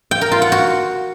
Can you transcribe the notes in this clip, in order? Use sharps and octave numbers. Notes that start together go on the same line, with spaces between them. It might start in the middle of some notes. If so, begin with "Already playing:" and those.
G5
A#4
F4
F#5
F#4